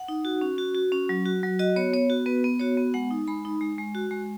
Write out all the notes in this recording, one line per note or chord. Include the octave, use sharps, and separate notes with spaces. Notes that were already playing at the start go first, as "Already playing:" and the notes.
Already playing: F#5
D#4
F#4
C#4
F#4
F#4
C#4
F#3
F#4
F#3
F#4 D#5
B3 C#5
B3 C#5
F#4
B3 B4
B3
F#4 C#5
B3
G#3 F#5
D#4
G#3 B5
D#4
G#3
G#3
F#4
G#3